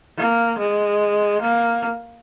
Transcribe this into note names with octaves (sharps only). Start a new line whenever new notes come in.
A#3
G#3
A#3